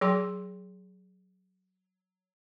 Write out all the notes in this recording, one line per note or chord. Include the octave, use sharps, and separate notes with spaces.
F#3 G#4 G5 C6